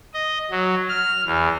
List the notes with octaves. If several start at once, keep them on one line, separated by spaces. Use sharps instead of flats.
D#5
F#3
F6
E2